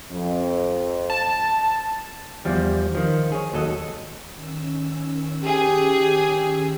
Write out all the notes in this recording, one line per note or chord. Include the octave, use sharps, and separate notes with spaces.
F2
A5
E2 F3 G3
D#3 F3
G#4 C#5
D#2 A2 F#3 F#4 A4 D#5
D#3 C#4 E6
G4 G#4